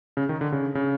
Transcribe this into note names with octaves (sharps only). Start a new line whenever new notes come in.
C#3
D#3
D3
C#3
C#3